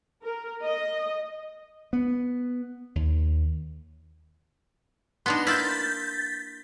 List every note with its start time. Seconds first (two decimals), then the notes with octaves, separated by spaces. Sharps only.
0.22 A#4
0.63 D#5
1.93 B3
2.95 D#2
5.26 B3 D4 D#4 C6
5.47 A#3 E4 G6 A6 B6